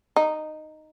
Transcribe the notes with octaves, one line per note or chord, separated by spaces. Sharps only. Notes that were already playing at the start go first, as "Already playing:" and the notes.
D#4